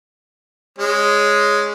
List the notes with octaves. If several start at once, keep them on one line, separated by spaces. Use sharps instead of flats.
G#3 C#4